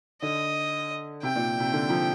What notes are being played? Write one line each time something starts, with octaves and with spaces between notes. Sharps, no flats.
D3 D#5
C3 G5
A#2
C3
D3
F3